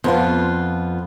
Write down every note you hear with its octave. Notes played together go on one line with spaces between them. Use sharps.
F2 B3 F4